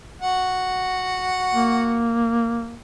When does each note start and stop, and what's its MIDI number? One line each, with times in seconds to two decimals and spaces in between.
0.21 2.07 66
0.21 2.07 78
1.54 2.80 58